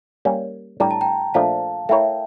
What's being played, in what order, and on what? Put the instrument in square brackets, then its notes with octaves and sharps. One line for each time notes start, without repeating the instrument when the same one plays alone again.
[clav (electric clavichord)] G3 A#3 C#4
[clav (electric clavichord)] A2 G3 D4 G4 [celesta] A#5
[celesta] A5
G5 A#5
[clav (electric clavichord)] A#2 F3 A3 D4 [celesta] F5 A5
[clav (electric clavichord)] A3 E4 A#4 C#5 [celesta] E5 G5